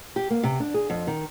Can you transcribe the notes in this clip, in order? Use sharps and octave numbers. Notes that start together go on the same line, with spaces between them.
G4
A#3
C3
D4
G#4
F2
D#3